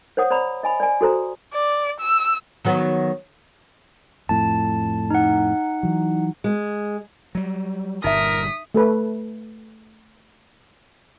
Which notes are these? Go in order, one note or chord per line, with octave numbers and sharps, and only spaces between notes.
C5 C#5 F#5 D#6
C5 D5 A#5 B5
D#5 G#5 B5
D5 G#5
F#4 A4 C5 A#5
D5
E6
D#3 F#3 B3
F2 A2 A5
D#4 F#5
E3 F#3
G#3
F#3 G3
G1 G2 A#2 D#4 A#4 E5 D#6 B6
A3 A4 B4